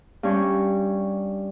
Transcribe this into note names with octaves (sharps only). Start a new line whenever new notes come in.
G2 C#4 C#5